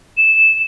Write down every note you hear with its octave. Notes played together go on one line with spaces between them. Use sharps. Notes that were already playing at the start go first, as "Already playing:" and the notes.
E7